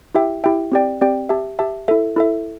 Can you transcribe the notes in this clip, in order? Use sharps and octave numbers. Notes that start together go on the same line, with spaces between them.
E4 G4 E5 G5
E4 G4 E5 G5
C4 G4 D5 G5
C4 G4 D5 G5
G4 E5 A5
G4 E5 A5
E4 A4 E5
E4 A4 E5